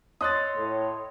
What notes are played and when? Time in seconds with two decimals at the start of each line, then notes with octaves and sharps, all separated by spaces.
0.21 C#5 D#5 C6 D#6 E6 F#6 A6
0.55 A2